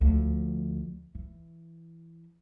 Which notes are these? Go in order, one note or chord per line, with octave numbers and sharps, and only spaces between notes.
D2 F3
E3